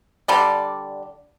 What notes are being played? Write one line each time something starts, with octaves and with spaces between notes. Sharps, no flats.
D3 G3 D5